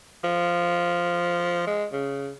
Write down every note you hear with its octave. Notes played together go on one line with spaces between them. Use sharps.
F3
G#3
C#3